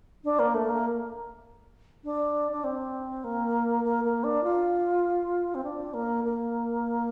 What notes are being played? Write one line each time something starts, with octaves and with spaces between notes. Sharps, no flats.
D4
A#3
A3
A#3
D4
D4
C4
A#3
A#3
A#3
D4
F4
C4
D4
A#3
A#3